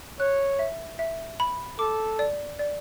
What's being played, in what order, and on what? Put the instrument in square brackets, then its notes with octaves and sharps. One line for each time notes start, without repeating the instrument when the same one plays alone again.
[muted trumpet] C#5 [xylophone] F#6
[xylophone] E5
E5
B5
[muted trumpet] A4 [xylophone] D6
[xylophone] D5
D5